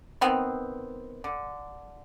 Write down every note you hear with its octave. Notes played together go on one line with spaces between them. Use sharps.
D#3 B3 C4
D3